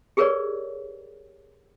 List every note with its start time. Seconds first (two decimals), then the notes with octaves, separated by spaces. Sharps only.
0.17 G4 G#4 A#4 B4 C#5 D5